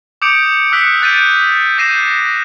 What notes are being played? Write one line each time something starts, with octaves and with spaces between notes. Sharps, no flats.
D6 D#6 G6 C#7 D7 F7
D#6 E6 F#6 B6 C#7
F#6 G6 A6 B6 D7 D#7
D6 G6 A#6 C7 D#7 E7